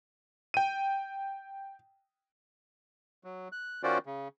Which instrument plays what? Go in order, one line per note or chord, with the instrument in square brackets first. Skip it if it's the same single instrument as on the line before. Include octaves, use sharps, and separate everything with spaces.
[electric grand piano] G5 D#7
[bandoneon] F#3
F#6
D#3 C#4 F4 F#4 C5 D5
C#3